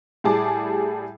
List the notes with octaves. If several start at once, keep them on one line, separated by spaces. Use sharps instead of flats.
A2 G3 G#4 A5 D6